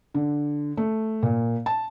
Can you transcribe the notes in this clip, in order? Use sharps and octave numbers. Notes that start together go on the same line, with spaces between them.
D3
A3
A#2
A5